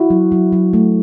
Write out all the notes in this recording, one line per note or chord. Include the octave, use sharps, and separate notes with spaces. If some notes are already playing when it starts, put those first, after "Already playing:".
Already playing: E4 F#4
F#3
F#3
F#3
A3